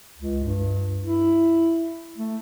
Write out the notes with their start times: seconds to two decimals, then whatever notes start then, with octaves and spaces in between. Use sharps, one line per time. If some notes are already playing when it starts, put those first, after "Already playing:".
0.18 C#2
0.44 G2
1.02 E4
2.18 A3